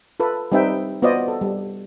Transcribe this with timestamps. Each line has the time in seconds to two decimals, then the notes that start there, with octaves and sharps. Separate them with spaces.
0.20 F4 A4 B4
0.52 G3 C4 D#4 B4 E5 G5
1.02 B3 F4 F#4 C5 D5 D#5
1.28 A4
1.41 G3